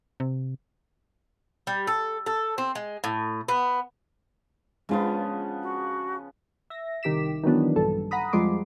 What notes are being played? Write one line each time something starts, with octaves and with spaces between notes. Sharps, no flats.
C3
G3
A4
A4
C4
G#3
A2
B3
C#3 F3 G#3 B3 D4 F4
F#4
E5 A#6
C2 D#3 G4 D6 B6 E7
D#3 E3 F#3 B3 D4
A#1 G2 A4
F#5 A#5 B5 D#6
F2 F3 G3 G#3 C6 D6